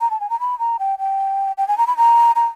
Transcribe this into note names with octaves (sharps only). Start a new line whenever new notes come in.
A#5
A5
G#5
A#5
B5
A#5
G5
G5
G5
G#5
A#5
B5
A#5
A#5